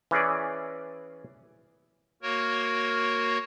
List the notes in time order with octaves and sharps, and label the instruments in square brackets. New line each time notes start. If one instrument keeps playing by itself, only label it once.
[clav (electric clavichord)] E3 C#4 G#4 D5
[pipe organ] A#3 F#4 A#4 C#5